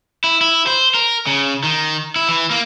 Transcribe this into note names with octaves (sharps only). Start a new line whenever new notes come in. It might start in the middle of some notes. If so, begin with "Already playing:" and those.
E4
E4
C5
A#4
C#3
D#3
E4
E3
A#3